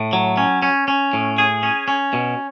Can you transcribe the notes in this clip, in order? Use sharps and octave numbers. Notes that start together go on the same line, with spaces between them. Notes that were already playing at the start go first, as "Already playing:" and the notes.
Already playing: A2
F#3
C#4
C#4
C#4
A2
G#4
C#4
C#4
B2